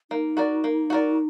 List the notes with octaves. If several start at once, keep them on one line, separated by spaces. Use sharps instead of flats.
A#3 D#4
F#4 A#4 D5
A#3
F#4 A#4 D5